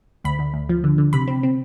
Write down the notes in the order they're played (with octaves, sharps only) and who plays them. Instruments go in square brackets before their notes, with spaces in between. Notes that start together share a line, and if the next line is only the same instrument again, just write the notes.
[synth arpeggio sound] D2 B5
D2
D2
F3
D3
D3
C3 B5
C4
C4